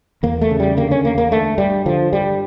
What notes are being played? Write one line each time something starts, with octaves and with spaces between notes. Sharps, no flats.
E2 A#3
A3
C#3
G3
D3 A#3
C#4
E2 A#3
A#3
D3 A3
G2 G3
D3 F3
G2 G3